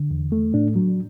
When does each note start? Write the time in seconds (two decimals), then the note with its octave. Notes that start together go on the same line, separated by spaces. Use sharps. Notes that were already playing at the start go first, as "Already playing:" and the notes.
Already playing: D3
0.11 E2
0.32 A3
0.54 A2 D4
0.75 F#3